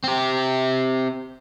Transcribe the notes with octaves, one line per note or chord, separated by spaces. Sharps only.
C4 G4